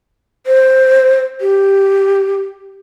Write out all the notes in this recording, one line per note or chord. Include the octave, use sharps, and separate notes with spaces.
C5
G4